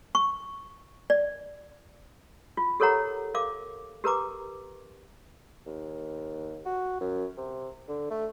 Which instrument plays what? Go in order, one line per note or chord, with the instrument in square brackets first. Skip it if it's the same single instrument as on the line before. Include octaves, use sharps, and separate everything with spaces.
[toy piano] C#6
D5
F4
G4 A4 A#4 C#5 F#5 A#5
A#4 F5 D6
G4 A#4 B4 A#5 D6
[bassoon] D#2
F#4
F#2
C3
D3
A3